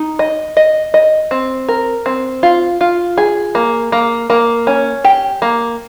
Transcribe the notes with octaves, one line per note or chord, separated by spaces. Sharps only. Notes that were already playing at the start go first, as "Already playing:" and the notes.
Already playing: D#4
D#5
D#5
D#5
C4
A#4
C4
F4
F4
G#4
A#3
A#3
A#3
C#4
G4
A#3